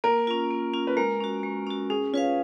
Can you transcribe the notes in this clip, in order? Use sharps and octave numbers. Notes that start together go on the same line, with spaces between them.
A#3 A#4
C#4 F4
A#3
C#4 F4
B4
G#3 A#4
C#4 F#4
G#3
C#4 F#4
C#4 G#4
C#4 F4 B4 F5